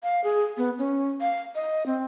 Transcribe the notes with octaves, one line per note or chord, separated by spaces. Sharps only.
F5
G#4
B3
C#4
F5
D#5
C4